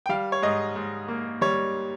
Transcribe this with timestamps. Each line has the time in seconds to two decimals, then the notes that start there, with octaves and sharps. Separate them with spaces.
0.06 G5
0.09 G3 F5
0.32 C#5
0.42 G#2 D#5
0.76 G#2
1.08 A#3
1.41 G3 C#5